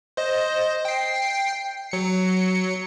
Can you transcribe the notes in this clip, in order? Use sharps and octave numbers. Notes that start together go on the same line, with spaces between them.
C5 D#5
G5 C7
F#3 C#7